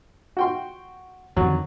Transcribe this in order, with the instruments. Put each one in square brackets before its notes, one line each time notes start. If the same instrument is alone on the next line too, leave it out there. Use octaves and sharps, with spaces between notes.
[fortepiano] F#4 G5 C6
[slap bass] F2 D3 D#3 [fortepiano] F#3